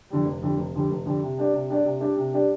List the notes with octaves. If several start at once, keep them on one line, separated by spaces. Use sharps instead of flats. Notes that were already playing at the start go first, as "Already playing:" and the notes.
F2 D3 G3
F1
F2 D3 G3
F1
F2 D3 G3
F1
F2 D3 G3
C3
G3 D4 G4 D5
C3
G3 D4 G4 D5
C3
G3 D4 G4 D5
C3
G3 D4 G4 D5